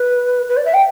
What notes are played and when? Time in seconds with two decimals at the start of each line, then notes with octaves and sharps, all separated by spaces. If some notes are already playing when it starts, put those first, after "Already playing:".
Already playing: B4
0.49 B4
0.57 D5
0.65 E5
0.74 G5